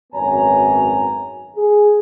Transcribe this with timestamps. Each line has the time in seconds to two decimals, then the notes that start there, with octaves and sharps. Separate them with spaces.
0.13 G#1 F#2 B3 C#5 G#5 A#5
1.57 G#4